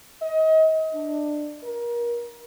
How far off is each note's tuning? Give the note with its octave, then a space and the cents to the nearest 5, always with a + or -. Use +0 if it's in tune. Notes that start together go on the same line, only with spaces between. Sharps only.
D#5 +30
D4 +20
A#4 +30